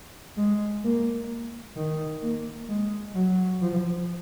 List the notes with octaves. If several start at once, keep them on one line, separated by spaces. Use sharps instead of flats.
G#3
A#3
D#3
A#3
G#3
F#3
F3